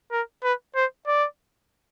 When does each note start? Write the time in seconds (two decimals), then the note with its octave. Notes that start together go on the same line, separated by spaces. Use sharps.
0.12 A#4
0.44 B4
0.76 C5
1.07 D5